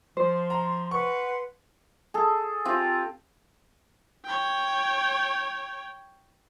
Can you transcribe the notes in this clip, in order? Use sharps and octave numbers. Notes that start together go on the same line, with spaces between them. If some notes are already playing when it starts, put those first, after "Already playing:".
F3 C5 C6
A#5
B4 F#5 C6 C#6
G#4 A4
C4 F4 G4
C#5 G5